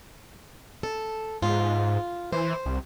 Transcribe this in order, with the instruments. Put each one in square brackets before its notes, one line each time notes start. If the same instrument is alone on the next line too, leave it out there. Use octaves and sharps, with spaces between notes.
[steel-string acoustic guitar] A4
[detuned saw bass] G#2 [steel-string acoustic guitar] F4
[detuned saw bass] E3 [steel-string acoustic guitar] C5
[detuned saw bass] C2